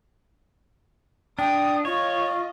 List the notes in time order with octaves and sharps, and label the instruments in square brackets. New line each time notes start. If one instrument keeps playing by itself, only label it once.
[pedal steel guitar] D4 [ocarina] G5 [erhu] D#6
[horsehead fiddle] F4 [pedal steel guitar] C#5 [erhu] D#5 [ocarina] C#6